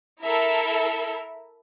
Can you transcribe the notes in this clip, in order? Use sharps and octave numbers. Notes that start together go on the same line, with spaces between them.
E4 A4 A#4 E5